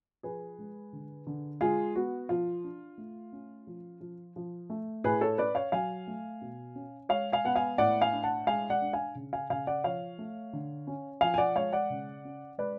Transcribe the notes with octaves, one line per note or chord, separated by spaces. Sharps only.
F3 G#4 B4
G#3
D3
D3
G#3 F4 G#4
B3 F#4
F3 F4
D4
A3
C#4
F3
F3
F3
A3
A2 G#4 B4
A4 C#5
C#4 B4 D5
C#5 F5
F#3 F5 G#5
A3
B2
C#4
G#3 C#5 F5
F5 G#5
B3 F#5
F5 G#5
A2 D5 F#5
F5 G#5
D4
F#5 A5
G#3 F5 G#5
D5 F#5
D4
F5 G#5
C#3
F5 G#5
C#3 F5 G#5
D5 F#5
F3 C#5 F5
A3
D3
C#4
F3 F5 G#5
G#5
D5 F#5
G#3 C#5 F5
D5 F#5
C#3
C#4
G#3 B4 D5